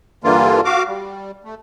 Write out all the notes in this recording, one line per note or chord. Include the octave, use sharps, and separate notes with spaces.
G2 D3 E3 A#3 F4
F#4 F5 D6
G3
A3